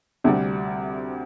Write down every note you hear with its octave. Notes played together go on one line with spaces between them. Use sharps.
D2 C3 G3